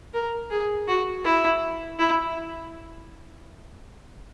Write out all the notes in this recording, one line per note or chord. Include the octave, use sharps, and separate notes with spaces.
A#4
G#4
F#4
E4
E4